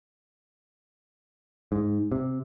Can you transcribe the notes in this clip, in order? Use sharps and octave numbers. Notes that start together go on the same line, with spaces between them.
G#2
C3